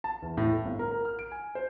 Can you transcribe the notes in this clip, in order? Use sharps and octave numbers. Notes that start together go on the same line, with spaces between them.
A5
E2
A2
A3
G1
A#4
A#4
F6
D7
G#5
C5